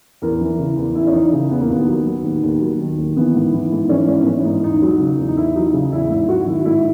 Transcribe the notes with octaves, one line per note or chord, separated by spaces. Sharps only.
E2 A#4
E3
C#3
E2
E2 E4
C#4
E3 D#4
C#3
E2 B3
A#3
D#2 B3
F#3
D#3
D#2
D#2
F#3
D#3
D#2
E3 B3
G#2
E3
G#2
E3 C#4
G#2 C#4
B3
E3 C#4
G#2 D#4
E2 D#4
F#3
C#3
E2
D#4
E2 E4
F#3 D#4
C#3
E2 E4
G#2 E4
F#3 F#4
D#3 E4
G#2 E4